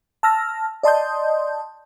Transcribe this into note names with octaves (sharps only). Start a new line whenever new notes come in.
A5 E6 F6 A#6
D5 D#5 A5 C6 D#6 G6